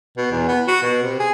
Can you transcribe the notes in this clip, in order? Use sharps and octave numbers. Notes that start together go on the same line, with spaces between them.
B2
E2
B3
F#4
B2
C3
G#4